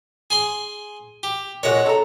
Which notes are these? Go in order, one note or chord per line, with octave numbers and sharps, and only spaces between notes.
G#4 G#5 C6
G4
A#2 G#3 F#4 C#5 F#5
A4 A#5